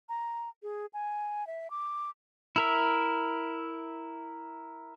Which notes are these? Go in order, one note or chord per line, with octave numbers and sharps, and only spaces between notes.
A#5
G#4
G#5
E5
D6
E4 A#4 E5